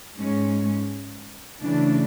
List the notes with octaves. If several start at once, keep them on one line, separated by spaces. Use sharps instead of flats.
G#2 G#3 C#4
C#3 E3 A3 D4